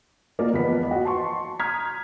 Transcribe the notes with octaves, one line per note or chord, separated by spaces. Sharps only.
A#3 F4 A#4 D5 D#5
E2 F3 B3 D#5 B6
F#4 D#5 F#5
A5 C6 C#6
A#5 D#6 F6 G6 G#6 B6